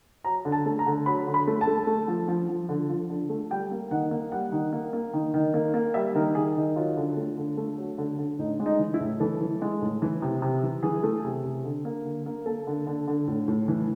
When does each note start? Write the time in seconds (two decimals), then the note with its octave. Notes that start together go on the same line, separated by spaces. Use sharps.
0.25 F#3 A#5
0.45 D3
0.52 A5
0.66 A3
0.79 A#5
0.86 D3
1.06 F#3 B5
1.27 D3
1.34 B5
1.47 A3
1.61 A5
1.67 A3
1.87 A3
2.08 F3
2.28 F3
2.49 F3
2.69 D3
2.89 F3
3.10 D3
3.30 A3
3.51 G3 G5
3.71 A#3
3.91 D#3 F#5
4.11 A#3
4.32 G3 F#5
4.52 D#3
4.73 A#3
4.93 A#3
5.13 D#3
5.34 D#3
5.54 A#3
5.74 A#3
5.94 G3 E5
6.15 D#3 A#4
6.35 D#3 G#4
6.56 D#3
6.76 F#3 F4
6.97 D3
7.17 A3
7.37 D3
7.57 A3
7.78 F#3
7.98 D3
8.19 D3
8.39 A2 D#4
8.60 G#3
8.66 D#4
8.79 E3
8.94 E4
9.00 A2
9.20 E3 A4
9.41 E3
9.62 G#3
9.82 A2
10.02 E3
10.22 C3
10.42 C3
10.63 E3
10.83 E3 G#4
11.03 A3
11.25 C3
11.44 C3
11.65 D3
11.85 A#3
12.05 D3
12.26 A#3
12.46 A#3 A4
12.67 D3
12.87 D3
13.08 D3
13.28 A2
13.48 A2
13.68 E3